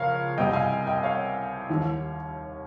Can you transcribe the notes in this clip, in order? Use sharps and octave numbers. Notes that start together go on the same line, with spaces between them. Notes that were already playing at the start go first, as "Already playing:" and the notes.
Already playing: C#2 C#3 F3 A#4 C#5 F5
C2 C3 G3 D#5 G5
F5 G#5
D#5 G5
C#5 F5
D#2 D#3 G3